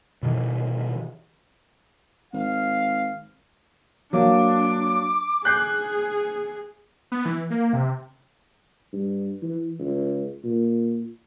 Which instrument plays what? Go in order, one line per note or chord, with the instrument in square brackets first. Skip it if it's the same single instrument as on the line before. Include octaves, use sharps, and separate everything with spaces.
[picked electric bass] B2 D#3 E3
[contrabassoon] G#1 [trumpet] F5
[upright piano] F#3 A#3 [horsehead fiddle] D4 [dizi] D6
[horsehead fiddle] G#4 [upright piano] F#6 G6 C7
[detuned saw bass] B3
E3
A#3
C3
[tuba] G2
E3
C#2
A#2